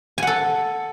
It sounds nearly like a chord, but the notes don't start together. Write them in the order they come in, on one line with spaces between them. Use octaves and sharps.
G#5 F#5 A4